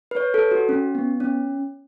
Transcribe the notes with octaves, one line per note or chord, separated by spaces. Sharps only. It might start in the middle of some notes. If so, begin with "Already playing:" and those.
B4
C#5
A4
F#4
C#4
B3
C#4